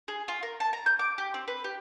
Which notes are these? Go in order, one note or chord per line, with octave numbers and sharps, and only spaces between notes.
G#4
F4
A#4
A5
A#5
G6
D6
G4
C4
B4
G4